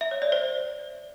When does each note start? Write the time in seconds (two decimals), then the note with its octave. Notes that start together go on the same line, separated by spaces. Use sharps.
0.01 E5
0.11 C#5
0.22 D5
0.32 C5